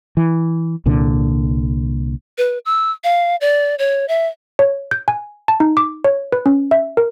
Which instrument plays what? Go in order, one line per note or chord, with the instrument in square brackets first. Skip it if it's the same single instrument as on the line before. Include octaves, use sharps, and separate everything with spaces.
[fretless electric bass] E3
C2 A#2 D3
[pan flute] B4
E6
F5
D5
C#5
E5
[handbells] C#5
G6
G#5
A5
D#4
D6
C#5
B4
C#4
E5
A#4